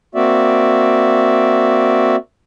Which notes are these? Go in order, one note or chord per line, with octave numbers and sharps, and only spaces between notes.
A#3 C4 F#4 D5 E5